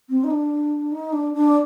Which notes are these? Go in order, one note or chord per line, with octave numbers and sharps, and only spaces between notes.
C4
D#4
D4
D#4
D4
D4